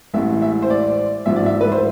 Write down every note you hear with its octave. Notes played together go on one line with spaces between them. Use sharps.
A1 A2 G#3 E5
E5
C5
D5
A1 G#2 F3 E5
D5
E5
B4
C5